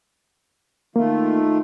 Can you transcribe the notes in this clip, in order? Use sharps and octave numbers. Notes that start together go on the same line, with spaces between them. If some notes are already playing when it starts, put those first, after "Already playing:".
D#3 A3 A#3 F4